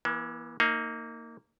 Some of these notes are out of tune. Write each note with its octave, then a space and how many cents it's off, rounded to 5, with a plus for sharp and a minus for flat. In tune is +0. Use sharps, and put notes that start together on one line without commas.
E3 +0 A#3 +45
A#3 -15 D#4 +15